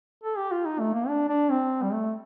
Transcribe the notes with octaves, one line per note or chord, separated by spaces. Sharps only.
A4
G4
F4
D#4
A3
A#3
D4
D4
C4
G3
A3